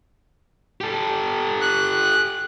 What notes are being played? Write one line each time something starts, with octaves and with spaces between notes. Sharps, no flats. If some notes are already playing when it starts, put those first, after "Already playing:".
G4 A4
F#6